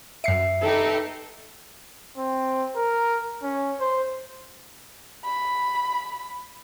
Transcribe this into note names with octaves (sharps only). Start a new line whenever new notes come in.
F#2 E5 C7 C#7
D#4 G4 A4 B4
C4
A#4
C#4
C5
B5